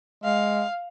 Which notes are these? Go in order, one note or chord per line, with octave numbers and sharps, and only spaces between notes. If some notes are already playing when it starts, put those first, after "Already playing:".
G#3 F5